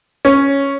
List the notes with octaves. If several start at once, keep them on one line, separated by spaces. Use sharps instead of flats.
C#4